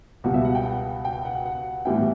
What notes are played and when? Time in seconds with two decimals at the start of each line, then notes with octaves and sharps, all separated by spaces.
0.24 C#2 B2 G3 F#4
0.34 E5
0.45 F#5
0.55 G5
0.65 F#5
1.05 G5
1.25 F#5
1.46 F#5
1.85 A2 E3 G3 B3 E4 G5